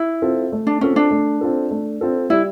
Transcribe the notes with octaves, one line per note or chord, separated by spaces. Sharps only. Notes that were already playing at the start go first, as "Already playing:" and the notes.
Already playing: E4
C4 F4 A4
A3
D4
C4 C#4 F4 A4
D4
A3
C4 F4 A4
A3
C4 F4 A4
G3 E4